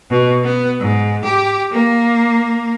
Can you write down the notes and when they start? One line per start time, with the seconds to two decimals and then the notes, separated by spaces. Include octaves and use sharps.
0.10 B2
0.44 B3
0.80 G#2
1.25 G4
1.73 A#3